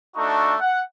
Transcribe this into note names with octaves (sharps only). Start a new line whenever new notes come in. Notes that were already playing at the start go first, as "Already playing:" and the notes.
A3 D4 D#4 F#4 A4 C#6
F#5